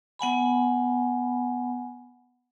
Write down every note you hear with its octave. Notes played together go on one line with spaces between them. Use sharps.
B3 F#5 G#5 B5